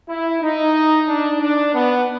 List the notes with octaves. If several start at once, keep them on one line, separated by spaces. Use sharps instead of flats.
E4
D#4
D4
D4
B3